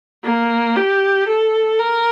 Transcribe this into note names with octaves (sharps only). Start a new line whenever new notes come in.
A#3
G4
A4
A#4